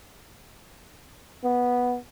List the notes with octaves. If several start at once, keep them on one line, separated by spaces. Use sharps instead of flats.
B3